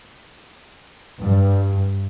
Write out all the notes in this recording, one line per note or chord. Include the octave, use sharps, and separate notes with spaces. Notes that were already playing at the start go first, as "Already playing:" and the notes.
G2